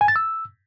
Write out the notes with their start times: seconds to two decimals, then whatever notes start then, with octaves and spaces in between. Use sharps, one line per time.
0.01 G#5
0.08 A6
0.16 E6